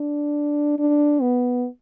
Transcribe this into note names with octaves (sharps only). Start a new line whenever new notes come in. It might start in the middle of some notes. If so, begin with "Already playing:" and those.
Already playing: D4
D4
B3